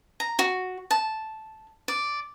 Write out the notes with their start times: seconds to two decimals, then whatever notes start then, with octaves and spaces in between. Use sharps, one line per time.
0.20 A#5
0.39 F#4
0.91 A5
1.88 D5